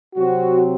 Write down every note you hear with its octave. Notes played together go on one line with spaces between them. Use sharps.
C3 F#3 C4 F#4